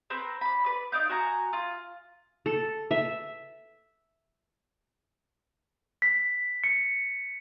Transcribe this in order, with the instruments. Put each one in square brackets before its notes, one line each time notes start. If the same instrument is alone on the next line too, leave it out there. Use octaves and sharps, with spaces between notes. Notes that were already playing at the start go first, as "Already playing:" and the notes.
[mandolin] C4 A#4 B4
D5 B5
B4 D5
D#4 D5 F5 G6
F#4 G#5 A#5
F4
[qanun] A4
E5
[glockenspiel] B6
C#7